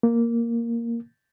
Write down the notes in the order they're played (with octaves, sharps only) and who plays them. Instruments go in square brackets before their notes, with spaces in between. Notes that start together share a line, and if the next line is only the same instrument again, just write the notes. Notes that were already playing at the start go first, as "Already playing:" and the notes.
[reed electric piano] A#3